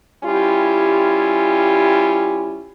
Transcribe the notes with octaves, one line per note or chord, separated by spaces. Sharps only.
G3 C#4 E4 F4 G4